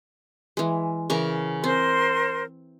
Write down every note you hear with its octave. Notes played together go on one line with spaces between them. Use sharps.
E3 G#3
C#3 E3 A#4
C4 A#4 C5 C6